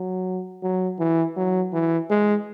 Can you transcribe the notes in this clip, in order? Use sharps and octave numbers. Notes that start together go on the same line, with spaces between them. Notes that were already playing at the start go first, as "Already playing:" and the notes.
Already playing: F#3
F#3
E3
F#3
E3
G#3